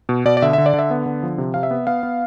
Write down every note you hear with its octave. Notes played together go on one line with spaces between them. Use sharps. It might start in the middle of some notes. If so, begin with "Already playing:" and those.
B2
B2 D5
D5
D3 E5
D3 E5
D5
D3
E5
B3
D3
F3
C3
C3 F5
E5
B3
B3 F5
B3